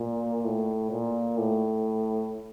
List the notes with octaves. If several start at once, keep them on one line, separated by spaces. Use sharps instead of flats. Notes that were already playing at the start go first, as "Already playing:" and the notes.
Already playing: A#2
A2
A#2
A2